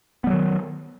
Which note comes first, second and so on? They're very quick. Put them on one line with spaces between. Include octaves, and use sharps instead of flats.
B3 G3 F#3 D#3